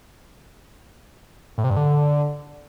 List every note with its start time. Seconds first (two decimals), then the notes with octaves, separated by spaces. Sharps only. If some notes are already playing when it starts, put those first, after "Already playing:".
1.58 A2
1.64 C3
1.70 G2
1.77 D3